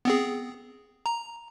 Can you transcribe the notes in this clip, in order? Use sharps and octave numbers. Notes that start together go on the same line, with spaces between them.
B3 C4 G#4
A#5